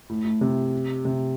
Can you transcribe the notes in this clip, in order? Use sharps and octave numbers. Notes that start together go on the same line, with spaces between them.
A2
A2
C3
C3